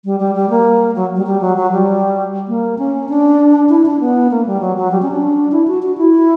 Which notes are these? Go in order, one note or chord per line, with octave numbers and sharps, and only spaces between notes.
G3
G3
G3
A#3
F#3
G3
G3
F#3
F#3
G3
A#3
C#4
D4
E4
D4
B3
A#3
G3
F#3
F#3
G3
C#4
D4
E4
F#4
F#4
E4